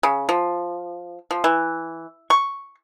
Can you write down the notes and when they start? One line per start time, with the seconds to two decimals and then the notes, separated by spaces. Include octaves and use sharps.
0.03 C#3
0.29 F3
1.31 F3
1.44 E3
2.30 C#6